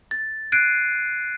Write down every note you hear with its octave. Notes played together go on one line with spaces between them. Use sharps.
A6
F#6 G#6 C7 D7 D#7